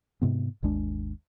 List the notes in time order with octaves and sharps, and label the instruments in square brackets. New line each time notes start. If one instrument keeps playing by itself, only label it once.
[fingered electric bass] G#2 C3 B3
G#1 D#2 G#3 D4